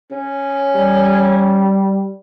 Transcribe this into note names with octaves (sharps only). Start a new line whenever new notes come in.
C#4
G3